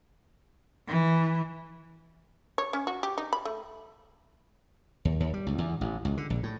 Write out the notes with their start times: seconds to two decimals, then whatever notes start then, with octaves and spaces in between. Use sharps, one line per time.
0.88 E3
2.58 C#5
2.73 C#4
2.87 F#4
3.03 G4
3.18 D#4
3.33 B5
3.45 A3
5.05 D#2
5.20 D#2
5.34 G3
5.47 C#2
5.58 E2
5.81 A1
6.05 C#2
6.17 D3
6.30 A#1
6.43 A2